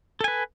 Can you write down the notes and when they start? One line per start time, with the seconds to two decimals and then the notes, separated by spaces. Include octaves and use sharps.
0.21 A4
0.24 G#5
0.28 B4